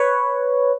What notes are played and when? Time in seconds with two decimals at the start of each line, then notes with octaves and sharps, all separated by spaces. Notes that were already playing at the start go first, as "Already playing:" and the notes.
Already playing: B4 C#5